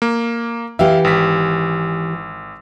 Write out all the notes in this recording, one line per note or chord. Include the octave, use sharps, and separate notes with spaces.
A#3
E3 G4 E5 F5
G#1 B6